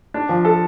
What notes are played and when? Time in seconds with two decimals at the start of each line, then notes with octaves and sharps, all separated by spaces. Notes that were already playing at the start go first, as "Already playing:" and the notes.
0.14 D4
0.29 F3
0.45 A4